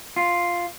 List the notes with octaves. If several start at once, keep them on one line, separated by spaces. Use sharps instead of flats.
F4